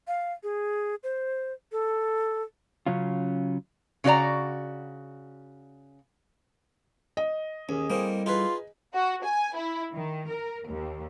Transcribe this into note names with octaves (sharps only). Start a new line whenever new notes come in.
F5
G#4
C5
A4
C#3 F#3 C#4 F4
C#3 C#4 F#4 D5 A#5
D#5
D#2 C#4 G#4
G3 A#3 C4 E4 A4
D#4 F4 G#4 B4
F#4
G#5
E4
D#3
A#4
D#2